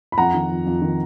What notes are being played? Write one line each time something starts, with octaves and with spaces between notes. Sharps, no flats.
B5
F2 F#5 A#5
D#3
F2
F2
D#3